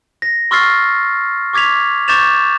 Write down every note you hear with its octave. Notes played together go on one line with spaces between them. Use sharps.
A#6
C6 C#6 E6 F6 A6 C7
C#6 D6 G#6 B6 F7
C#6 D6 G6 A6 E7 F7